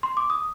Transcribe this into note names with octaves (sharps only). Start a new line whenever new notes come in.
C6
D6
D#6